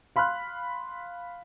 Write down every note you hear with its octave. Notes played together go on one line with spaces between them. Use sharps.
F5 B5 C6 F6 F#6